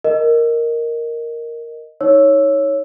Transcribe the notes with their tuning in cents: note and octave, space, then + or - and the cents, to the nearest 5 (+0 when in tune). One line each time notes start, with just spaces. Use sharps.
A#4 +0 D#5 +0
D#4 +30 C#5 +0 E6 +0